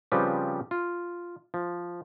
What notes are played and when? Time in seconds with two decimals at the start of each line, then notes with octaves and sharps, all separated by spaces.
0.12 C#3 F3 G3 C4 G4 B4
0.71 F4
1.54 F3